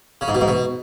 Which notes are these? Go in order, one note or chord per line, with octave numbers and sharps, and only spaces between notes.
C#3
G#2
B2
G#2
B2